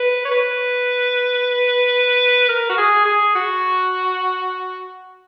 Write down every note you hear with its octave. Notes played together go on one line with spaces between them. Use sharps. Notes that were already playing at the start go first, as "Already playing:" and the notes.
Already playing: B4
C#5
B4
A#4
F#4
G#4
G#4
F#4